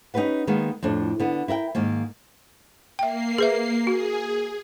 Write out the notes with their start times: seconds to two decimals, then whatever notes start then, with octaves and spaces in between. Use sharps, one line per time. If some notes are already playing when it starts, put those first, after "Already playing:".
0.14 C#4 D#4 F4 G4 B4 F#5
0.47 D#3 G#3 A#3 B3
0.83 F2 A2 D4
1.20 D3 B3
1.48 E4 A#4 E5 G5
1.75 G#2 D#3 A#3
2.99 A#3 E5 G5 C7
3.38 G#4 B4 E5
3.87 F#4 G#4